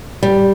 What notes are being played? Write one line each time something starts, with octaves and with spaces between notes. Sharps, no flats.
G3